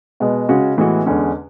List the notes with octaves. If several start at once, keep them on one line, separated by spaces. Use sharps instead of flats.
B2 G#3 B3
C#3 G#3 C#4 F#4
A2 E3 G#3 B3 F#4
E2 D3 G#3 C#4